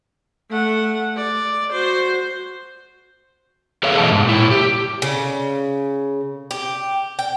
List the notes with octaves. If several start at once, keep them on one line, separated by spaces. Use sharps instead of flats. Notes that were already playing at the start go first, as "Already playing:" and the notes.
A3 F#5
D5
F#4 C5
G#4 A4 B4 C#5 E5 F5
B2 E3 A3 B3 D#5 A5
G#2
A#2 E4
G4
C#3
G4
G5